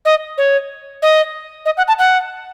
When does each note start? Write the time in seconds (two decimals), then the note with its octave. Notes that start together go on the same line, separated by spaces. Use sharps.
0.05 D#5
0.38 C#5
1.02 D#5
1.66 D#5
1.77 F#5
1.88 A5
1.99 F#5